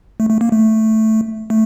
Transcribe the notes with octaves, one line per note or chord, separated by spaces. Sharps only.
A3
A3
A#3
A3
A3